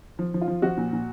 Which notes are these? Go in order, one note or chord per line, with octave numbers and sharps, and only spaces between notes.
F3
F3
F4
F3
F3 F#4
A#2
A#2